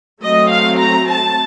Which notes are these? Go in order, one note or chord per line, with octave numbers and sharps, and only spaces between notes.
F#3 A3 C4 D#5
F5
A#5
A5